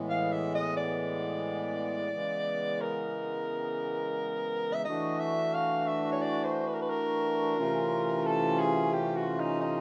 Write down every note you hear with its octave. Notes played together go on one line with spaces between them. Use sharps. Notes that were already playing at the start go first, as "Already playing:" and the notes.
Already playing: A2 E3 G#3 B3
F5
E5
D#5
D5
C#3 E3 G#3 B3
A#4
E5
E3 A3 D4 F#4 D#5
E5
F5
E5
C#5
D5
C5
B4
A#4
B4
A#4
C3 E3 A3 C#4 F4
A4
G#4
G4
F#4
D#4
D#4